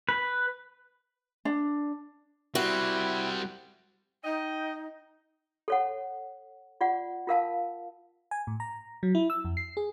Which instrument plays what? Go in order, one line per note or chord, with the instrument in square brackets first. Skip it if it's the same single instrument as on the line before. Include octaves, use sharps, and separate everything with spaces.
[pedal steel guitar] B4
[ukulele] D4
[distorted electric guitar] G3 C4 [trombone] E4 [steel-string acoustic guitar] F#4
[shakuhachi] D#4 [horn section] D#5 G5
[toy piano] A4 C#5 F#5
F4 D5 F#5
F4 A#4 F5 A5
[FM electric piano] G#5
A2
A#5
F#3
E4
E6
F2
C7
G#4